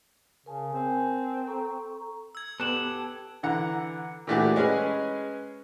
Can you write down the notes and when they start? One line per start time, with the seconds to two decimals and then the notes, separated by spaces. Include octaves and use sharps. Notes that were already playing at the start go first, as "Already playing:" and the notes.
0.46 C#3 A#4 G#5 A5
0.73 C4
1.47 A4 A#5 C#6
2.35 E6 G#6
2.60 B3 G4 A4 F#6 E7 F#7
3.43 D3 E3 F#5 A#5
4.27 A#2 E3 A3 D4 F#4 G4
4.56 G#3 C#4 G#4 B4